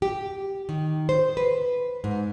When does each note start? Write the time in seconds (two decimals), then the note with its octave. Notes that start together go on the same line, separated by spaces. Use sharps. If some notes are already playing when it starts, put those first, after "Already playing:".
0.02 G4
0.69 D#3
1.09 C5
1.37 B4
2.04 G#2